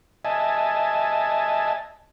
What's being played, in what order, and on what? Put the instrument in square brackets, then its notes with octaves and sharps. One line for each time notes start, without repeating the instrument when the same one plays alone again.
[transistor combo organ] D#5 E5 G#5 A5